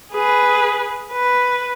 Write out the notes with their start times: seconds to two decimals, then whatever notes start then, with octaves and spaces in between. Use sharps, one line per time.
0.11 G#4 B4
1.12 B4